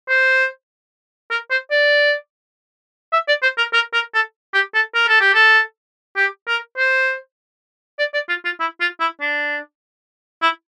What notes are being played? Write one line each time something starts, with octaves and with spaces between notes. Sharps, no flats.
C5
A#4
C5
D5
E5
D5
C5
A#4
A#4
A#4
A4
G4
A4
A#4
A4
G4
A4
G4
A#4
C5
D5
D5
F4
F4
E4
F4
E4
D4
E4